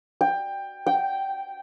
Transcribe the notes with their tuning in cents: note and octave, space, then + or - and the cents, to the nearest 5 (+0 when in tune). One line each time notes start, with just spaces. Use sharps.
G5 +15
G5 -10